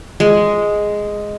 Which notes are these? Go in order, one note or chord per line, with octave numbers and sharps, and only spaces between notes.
G#3